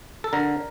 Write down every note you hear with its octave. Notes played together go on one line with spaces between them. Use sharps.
A4
D3 A#4